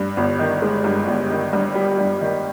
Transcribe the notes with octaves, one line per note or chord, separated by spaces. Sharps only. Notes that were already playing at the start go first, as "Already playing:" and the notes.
Already playing: G2
G1
D#3
G#3
G2
G1
D#3
G2
G3
G2
D#3